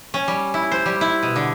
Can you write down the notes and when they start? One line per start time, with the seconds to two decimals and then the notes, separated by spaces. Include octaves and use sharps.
0.14 C#4
0.28 G3
0.54 E4
0.72 C5
0.86 G3
1.01 E4
1.23 B2
1.36 D3